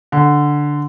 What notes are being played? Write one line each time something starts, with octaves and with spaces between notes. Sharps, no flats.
D3